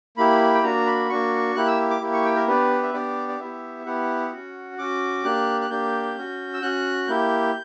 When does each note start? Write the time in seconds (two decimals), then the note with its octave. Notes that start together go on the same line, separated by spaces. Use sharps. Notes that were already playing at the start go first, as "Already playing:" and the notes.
0.17 A#3 E4 G4 B5
0.55 G5
0.64 A#3 D4 F#4 A#5
0.87 B5
1.09 A#3 D4 F#4 C#6
1.55 A#3 E4 G4 F#6
1.67 E6
1.90 D6
2.01 A#3 E4 G4
2.13 C#6
2.25 G5
2.36 A#4
2.47 B3 D4 G4 B4
2.83 E5
2.94 B3 D4 G4 D5
3.28 D5
3.40 B3 E4 G4 E5
3.86 B3 E4 G4 F#5
4.32 C#4 F#4
4.78 C#4 F#4 D6
5.24 A#3 D4 G4 F#6
5.61 F#6
5.70 A#3 D4 G4 G6
6.16 C#4 F#4
6.54 E6
6.62 C#4 F#4 F#6
7.08 A#3 E4 G4 G6